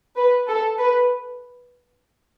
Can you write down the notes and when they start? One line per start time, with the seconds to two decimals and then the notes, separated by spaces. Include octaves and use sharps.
0.16 B4
0.48 A4
0.78 B4